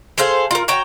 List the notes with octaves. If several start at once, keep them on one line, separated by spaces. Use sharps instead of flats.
G#4 A4 C5 F5
F4 A#4
F#4 C#5 G5 A#5